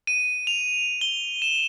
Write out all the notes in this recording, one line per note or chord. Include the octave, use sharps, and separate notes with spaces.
D#7
F7
G7
E7